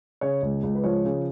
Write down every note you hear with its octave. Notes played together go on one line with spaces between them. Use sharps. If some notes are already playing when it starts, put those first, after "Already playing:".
C#3 C#5
C#2
C#2
B4
F3 C#5
C#3